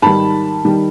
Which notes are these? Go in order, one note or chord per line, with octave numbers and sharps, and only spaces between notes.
G#2 D#3 G3 A5 B5
D#3 G3